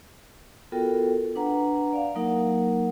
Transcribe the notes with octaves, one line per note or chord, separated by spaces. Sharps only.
B3 F4 F#4 A4 A#4 G5
D4 B4 F#5 A#5
D5 F5
F#3 A#3 D#4 A#4 F#5